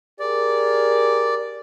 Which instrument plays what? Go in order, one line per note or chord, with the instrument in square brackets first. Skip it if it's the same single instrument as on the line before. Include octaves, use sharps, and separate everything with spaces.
[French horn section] G4 G#4 A#4 [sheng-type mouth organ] D5